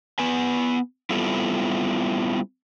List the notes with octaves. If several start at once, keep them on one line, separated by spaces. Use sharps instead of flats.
B3 B4 G#5
G3 B3 C4 E4 F4 A4